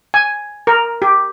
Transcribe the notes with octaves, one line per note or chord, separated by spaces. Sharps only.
G#5
A#4
G4